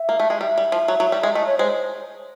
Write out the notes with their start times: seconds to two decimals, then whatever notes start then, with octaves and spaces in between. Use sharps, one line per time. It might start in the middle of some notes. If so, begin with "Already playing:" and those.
Already playing: E5
0.09 A#3
0.20 A3
0.30 G#3
0.41 G3 E5
0.58 G3
0.72 F3
0.88 F#3
1.00 F#3
1.12 G3
1.23 G#3
1.35 A3 D#5
1.47 C#5
1.59 G#3 C5